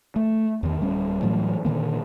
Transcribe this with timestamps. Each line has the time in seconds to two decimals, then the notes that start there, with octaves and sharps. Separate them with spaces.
0.16 A3
0.63 E2 D#3
0.81 D1 G3 C#4
1.22 A2 E3 F#3 A3
1.65 A#2 D3 D#3 A#3